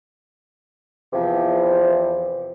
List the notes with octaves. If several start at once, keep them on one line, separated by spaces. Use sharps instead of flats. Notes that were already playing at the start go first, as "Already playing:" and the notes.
E2 C3 E3 F3